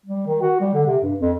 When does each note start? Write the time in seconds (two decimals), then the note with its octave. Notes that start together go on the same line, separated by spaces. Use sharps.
0.06 G3
0.27 D#3
0.41 F#4
0.60 G3
0.74 D3
0.86 C3
1.03 G2
1.20 F2